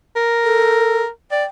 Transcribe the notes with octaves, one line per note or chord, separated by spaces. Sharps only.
A#4
A4
D5 G5